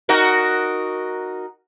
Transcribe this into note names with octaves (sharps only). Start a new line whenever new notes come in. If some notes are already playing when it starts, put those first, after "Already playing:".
D#4 F#4 A#4